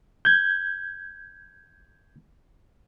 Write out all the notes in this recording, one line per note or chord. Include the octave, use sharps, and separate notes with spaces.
G6 G#6